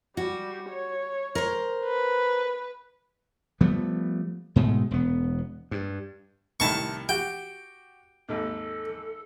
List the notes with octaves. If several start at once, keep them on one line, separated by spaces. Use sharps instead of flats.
G3 F#4
C#5
A#4 C5
B4
F3 G3 A3 B3
G#2 B2 G#3 A3
E1 B3
G2
C2 A2 D#3 A5 C#6
F#4 G4 G5
G#1 D#2 A4